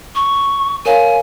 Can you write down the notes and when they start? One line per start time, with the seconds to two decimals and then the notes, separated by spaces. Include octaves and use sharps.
0.15 C#6
0.86 A#4 C#5 F5 G#5